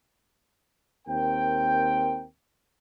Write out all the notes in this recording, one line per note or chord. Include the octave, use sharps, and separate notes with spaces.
D#2 C4 A#4 G5